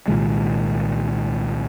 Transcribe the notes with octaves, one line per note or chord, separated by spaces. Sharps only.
C2 A#2 D#3 G#3